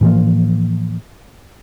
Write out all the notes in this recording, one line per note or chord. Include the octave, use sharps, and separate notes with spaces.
A2 E3 F3 A#3